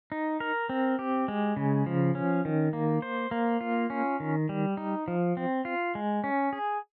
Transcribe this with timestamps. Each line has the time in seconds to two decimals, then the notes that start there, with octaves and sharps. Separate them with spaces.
0.12 D#4
0.40 A#4
0.69 C4
0.99 G4
1.28 G#3
1.56 C#3
1.86 F3
2.15 C#4
2.45 D#3
2.73 A#3
3.02 C5
3.31 A#3
3.61 F4
3.90 C#4
4.20 D#3
4.49 G3
4.77 D#4
5.08 F3
5.37 C4
5.65 F4
5.95 G#3
6.24 C#4
6.53 G#4